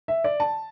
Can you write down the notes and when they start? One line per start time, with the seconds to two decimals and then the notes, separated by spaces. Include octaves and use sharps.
0.08 E5
0.24 D5
0.40 A5